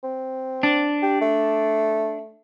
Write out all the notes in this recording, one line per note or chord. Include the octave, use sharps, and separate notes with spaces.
C4
D4
G4
A3